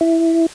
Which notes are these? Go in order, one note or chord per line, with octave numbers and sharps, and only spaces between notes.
E4